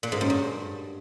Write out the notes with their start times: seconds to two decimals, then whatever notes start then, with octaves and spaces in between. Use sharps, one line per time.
0.03 A#2
0.12 G#2
0.21 F#2
0.30 G2